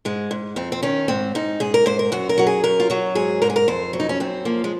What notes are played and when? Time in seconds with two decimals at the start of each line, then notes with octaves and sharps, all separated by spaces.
0.05 G#2 G#3
0.31 G#2
0.56 F2 C4
0.72 C4
0.83 D#3 C#4
1.08 G#2 C4
1.35 G#2 D#4
1.60 G#2 G#4
1.74 A#4
1.86 G#2 C5
1.99 A#4
2.12 F#2 F#4
2.29 A#4
2.38 F#3 F#4
2.47 G#4
2.64 F#2 A#4
2.80 F4
2.90 F#3 F#4
3.15 G#2 G#4
3.42 G#2 A#4
3.50 G#4
3.56 A#4
3.68 F2 C5
3.93 F#3
4.00 D#4
4.09 C#4
4.20 F#2 C4
4.45 F3 A#3
4.64 G#3